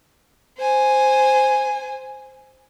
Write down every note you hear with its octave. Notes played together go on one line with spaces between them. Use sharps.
C5 G#5